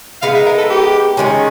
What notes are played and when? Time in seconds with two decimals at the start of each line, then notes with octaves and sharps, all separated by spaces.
0.22 G#3 B3 D#4 F5
0.34 E5
0.46 A#4
0.58 A4
0.70 G4
1.17 D#3 G#3 C#4